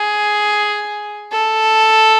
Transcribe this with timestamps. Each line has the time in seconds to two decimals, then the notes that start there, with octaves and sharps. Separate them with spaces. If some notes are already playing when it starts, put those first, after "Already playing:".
Already playing: G#4
1.32 A4